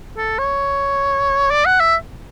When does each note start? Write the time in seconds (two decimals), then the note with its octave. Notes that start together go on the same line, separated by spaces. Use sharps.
0.17 A4
0.39 C#5
1.51 D5
1.65 F#5
1.80 E5